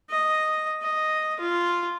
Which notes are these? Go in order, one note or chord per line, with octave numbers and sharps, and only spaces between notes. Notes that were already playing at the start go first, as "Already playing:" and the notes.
D#5
D#5
F4